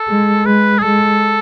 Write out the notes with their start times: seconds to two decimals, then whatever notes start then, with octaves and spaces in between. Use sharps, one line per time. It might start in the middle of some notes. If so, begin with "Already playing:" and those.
Already playing: A4
0.08 G#3
0.45 G#3 B4
0.78 G#4
0.83 G#3 A4